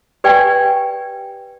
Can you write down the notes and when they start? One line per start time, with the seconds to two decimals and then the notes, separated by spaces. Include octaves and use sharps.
0.24 G4 B4 D5 G5 G#5